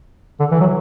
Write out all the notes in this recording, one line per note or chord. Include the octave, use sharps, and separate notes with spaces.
D3
E3
F#3